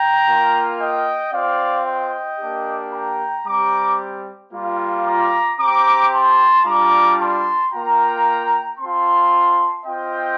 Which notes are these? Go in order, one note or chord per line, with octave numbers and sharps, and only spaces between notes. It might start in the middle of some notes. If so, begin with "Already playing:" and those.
Already playing: G5 A#5
A#3 F4
D#5 G5
C4 F4 D5 F5
D#5 G5
A#3 D4 G4
G5 A#5
G3 C4 G4 A#5 D6
G3 A#3 F4
A#5 D6
C4 G4 A#5 D6
A5 C6
G3 D4 F4 A#5 D6
A5 C6
A#3 F4 G5 A#5
C4 F4 A5 C6
C4 F4 D#5 G5